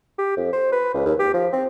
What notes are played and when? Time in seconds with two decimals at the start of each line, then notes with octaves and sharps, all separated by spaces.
0.18 G4
0.37 F2
0.52 C5
0.72 B4
0.94 C#2
1.05 D#2
1.19 G4
1.34 F3
1.52 C4